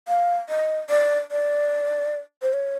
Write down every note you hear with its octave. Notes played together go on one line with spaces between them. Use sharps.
F5
D#5
D5
D5
C5
C#5